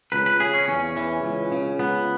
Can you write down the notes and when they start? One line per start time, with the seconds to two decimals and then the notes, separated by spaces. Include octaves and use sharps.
0.12 C#2 B4
0.26 B4
0.40 C#3 G#4
0.54 C#4
0.68 E2 C#4
0.97 E3
1.23 C#2
1.52 C#3
1.79 C#2 B3